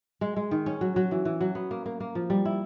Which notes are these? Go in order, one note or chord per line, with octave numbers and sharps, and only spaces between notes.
G#3
G#3
D#3
C#4
F#3
F#3
E3
E3
F#3
B3
A#3
A#3
A#3
F3
G3
E4